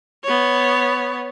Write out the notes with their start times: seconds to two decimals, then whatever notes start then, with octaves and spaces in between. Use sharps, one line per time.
0.24 B3 C#5